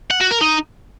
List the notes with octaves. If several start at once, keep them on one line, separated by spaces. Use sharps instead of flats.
F#5
F#4
A#4
D#4